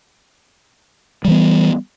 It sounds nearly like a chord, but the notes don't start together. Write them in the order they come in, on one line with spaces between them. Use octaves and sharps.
G3 E3 B3